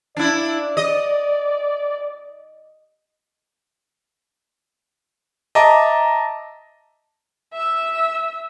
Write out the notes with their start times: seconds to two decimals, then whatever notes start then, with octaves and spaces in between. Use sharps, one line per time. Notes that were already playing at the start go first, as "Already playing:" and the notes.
0.17 D4 E4 D5
0.77 D#5
5.55 D#5 E5 A5 A#5 D6
7.53 E5 E6